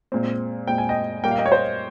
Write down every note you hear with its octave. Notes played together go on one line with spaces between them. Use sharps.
A#2 G#3 C4
A#2 G#3 C4 G5
G#5
D#5 G5
A#2 G3 A#3 G5
F5
D#5 G5
C#5
C5 D#5